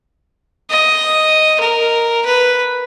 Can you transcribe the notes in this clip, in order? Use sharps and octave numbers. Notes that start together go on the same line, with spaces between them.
D#5
A#4
B4